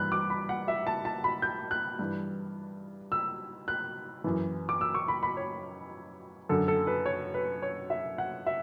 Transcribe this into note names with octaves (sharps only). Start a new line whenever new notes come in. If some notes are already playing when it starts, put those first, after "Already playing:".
Already playing: G2 E3 B5 F#6
D6
B5
F#5
E5
A5
A5
B5
G6
F#6
G2 E3
E6
F#6
F#2 E3
D6
E6
C#6
B5
B5
C#5
F#2 D3 A4
A4
B4
C#5
B4
C#5
E5
F#5
E5